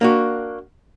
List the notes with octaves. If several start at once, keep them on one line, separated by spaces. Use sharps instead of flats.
A#3 D4 F#4